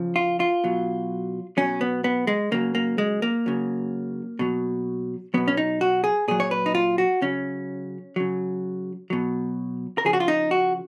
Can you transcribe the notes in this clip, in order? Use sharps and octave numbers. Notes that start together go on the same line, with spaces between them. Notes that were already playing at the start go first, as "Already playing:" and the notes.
Already playing: C#3 F3
F4
F4
B2 F#3
B2 F#3 C#4
B3
B3
G#3
C#3 F#3 A#3
A#3
G#3
A#3
C#3 F#3
B2 F#3
B2 F#3 B3
C#4
D#4
F#4
G#4
A#2 F#3 G#4
C#5
B4
D#4
F4
F#4
C#3 F#3 C#4
C#3 F#3
B2 F#3
A#4
C#3 F3 G#4
F#4
F4
D#4
F#4